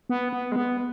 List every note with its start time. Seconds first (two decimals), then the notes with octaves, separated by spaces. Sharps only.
0.09 B3
0.33 B3
0.52 G#3
0.56 B3